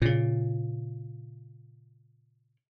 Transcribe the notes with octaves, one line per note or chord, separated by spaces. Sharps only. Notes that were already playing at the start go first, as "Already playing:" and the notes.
A#2 C#3